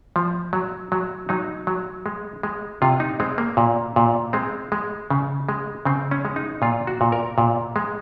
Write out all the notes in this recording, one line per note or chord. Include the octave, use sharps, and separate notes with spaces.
F3
F#3
F#3
F#3 D#4
F#3
G#3
G#3
C3 F4
D#4
G#3 C4
A#3
A#2
A#2
G#3 C4
G#3
C#3
G#3
C#3 C4
C#4
G#3
D#4
A#2 F4
F#4
A#2
A#4
A#2
G#3